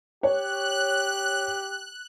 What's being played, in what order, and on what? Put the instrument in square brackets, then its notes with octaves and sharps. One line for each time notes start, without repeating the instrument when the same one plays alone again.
[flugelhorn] G4 [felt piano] C#5 [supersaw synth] F#6